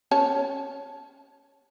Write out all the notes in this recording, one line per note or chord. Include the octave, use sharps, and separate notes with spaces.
C#4 C#5 A5